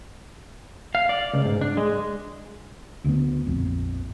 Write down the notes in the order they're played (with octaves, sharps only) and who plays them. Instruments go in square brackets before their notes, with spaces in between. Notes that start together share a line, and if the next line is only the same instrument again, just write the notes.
[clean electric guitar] F5
D5
C#2
G#2
D4
G#3
[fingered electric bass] D2 D3 B3
A#1 F2